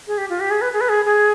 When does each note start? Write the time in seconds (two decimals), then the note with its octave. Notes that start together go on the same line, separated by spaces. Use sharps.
0.07 G#4
0.18 G4
0.30 F4
0.40 G4
0.51 G#4
0.61 B4
0.73 G#4
0.81 B4
0.89 G#4
1.05 G#4